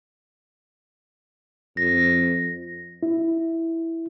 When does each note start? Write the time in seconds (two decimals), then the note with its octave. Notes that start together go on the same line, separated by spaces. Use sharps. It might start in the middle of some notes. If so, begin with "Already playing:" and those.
1.77 F2 A#6
3.03 E4